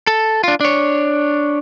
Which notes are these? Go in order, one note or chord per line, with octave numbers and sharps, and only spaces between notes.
A4
D4 F4
D4 C#5